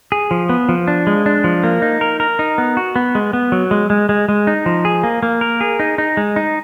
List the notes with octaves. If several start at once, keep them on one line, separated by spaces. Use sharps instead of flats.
G#4
F3
B3
F3
D4
G#3
D4
F3
A#3
D#4
A#4
A#4
D#4
B3
F#4
B3
G#3
B3
F#3
G#3
G#3
G#3
G#3
D#4
F3
G#4
A#3
A#3
A#4
G#4
D#4
D#4
G#3
D#4